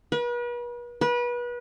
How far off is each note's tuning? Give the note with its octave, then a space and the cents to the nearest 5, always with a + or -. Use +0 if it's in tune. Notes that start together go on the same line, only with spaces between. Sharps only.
B4 -40
B4 -30